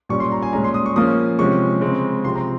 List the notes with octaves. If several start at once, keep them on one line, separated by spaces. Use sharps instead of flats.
A#2 G3 C#4 C#6
C6
A#5
G#5
A#2 G#3 C#4 A#5
C6
D#6
C#6
F3 A#3 C#4 D#6
C3 F3 G#3 C#4 C#6
C#3 G#3 C4
C3 F3 C4 C6
A#5